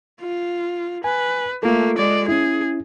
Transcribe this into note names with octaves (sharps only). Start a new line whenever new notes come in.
F4
B4 G#5
A3 A#3 F4 A4
G#3 D5
C#4 E4 G#4